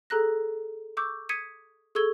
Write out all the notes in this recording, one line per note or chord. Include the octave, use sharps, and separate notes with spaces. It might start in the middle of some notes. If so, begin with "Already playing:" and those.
G#4 A4 A#5 F#6 A#6
C#6 D6 E6 G6
D#6 G#6 B6 C#7 D#7
G#4 A4 C#6 E6 G#6 G7